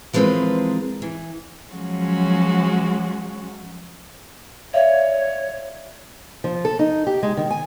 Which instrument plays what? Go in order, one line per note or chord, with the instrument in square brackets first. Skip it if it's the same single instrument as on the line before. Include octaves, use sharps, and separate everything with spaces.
[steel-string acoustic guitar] E3 F3 G#3 C4 A#4 B4
E3
[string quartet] F3 F#3 G#3 C#4 F#4
[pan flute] C#5 [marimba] D5 E5 F5
[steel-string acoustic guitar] F3
A4
D#4
G4
G#3
D#3
G#5